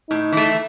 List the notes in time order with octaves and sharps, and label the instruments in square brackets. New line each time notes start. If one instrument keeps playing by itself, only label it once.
[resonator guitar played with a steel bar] A2 [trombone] D#4
[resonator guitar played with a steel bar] E3 A3